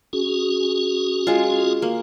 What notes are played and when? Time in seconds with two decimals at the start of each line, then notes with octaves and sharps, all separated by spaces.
0.13 C#4 F#4 G#4
1.27 G#3 F4
1.82 A#3